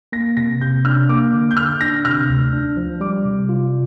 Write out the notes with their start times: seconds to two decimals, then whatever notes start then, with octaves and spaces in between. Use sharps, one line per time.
0.12 A#3 A#6
0.37 C3 A#6
0.61 C3 G6
0.85 D4 F6
1.09 A#3 D6
1.33 D3
1.51 G6
1.57 D3 F6
1.81 D4 A#6
2.05 C3 F6
2.29 D2
2.53 D4
2.77 F3
3.01 G3 D6
3.25 C3
3.49 F4